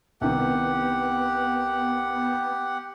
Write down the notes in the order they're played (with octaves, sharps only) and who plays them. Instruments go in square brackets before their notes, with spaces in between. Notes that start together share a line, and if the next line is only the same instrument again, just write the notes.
[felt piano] C2 D#3 [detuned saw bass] B3 [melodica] G4 F#5